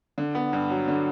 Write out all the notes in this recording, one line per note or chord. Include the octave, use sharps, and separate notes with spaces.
D3
B3
G2
F#3
D3